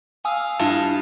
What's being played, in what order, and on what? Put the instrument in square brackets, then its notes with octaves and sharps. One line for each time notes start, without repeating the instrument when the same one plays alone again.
[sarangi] F5 [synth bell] G#5 D#6 E6
[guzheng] G2 [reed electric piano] E4 F4 A5